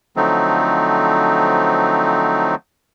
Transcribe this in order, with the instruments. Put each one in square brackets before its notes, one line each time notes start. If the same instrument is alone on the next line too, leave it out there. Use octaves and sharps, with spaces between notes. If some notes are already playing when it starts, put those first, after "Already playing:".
[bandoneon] D3 F3 F#3 A3 C4 D#4